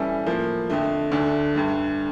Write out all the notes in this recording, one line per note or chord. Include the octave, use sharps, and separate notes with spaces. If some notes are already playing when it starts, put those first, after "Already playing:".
Already playing: E3 G3 C#4 E4 A4
A2 F3 A#3
F2 D3 A3
D2 D3 A3 D4
G2 D3 A3